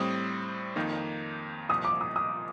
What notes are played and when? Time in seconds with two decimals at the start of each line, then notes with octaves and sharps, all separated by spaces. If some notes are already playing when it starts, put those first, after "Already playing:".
Already playing: A2 G3 C4 D#6
0.76 F2 D#3 A#3 D#4
1.69 C2 A#2 F3 D#6
1.85 D6
2.01 D#6
2.16 D#6